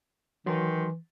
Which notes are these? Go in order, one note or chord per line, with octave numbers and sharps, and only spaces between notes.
D#3 E3 F#3 C6